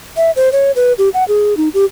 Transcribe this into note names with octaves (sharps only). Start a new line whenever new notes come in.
E5
C5
C#5
B4
G4
F#5
G#4
D#4
G4